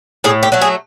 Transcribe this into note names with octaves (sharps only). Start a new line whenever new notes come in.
A2 G#4
G4
F#3 A3
G#4